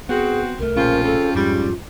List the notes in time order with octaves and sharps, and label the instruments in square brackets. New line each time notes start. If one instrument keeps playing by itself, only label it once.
[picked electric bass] B3 [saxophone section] C4 F#4 [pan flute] G#4
[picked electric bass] C2 A3 [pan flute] A#4
[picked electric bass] B1 A#2 A3 [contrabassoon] C#3 [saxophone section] F3 C4 F4
[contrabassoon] C#3 [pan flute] A4
[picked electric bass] F2 G#2 [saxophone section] G3 [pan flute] F4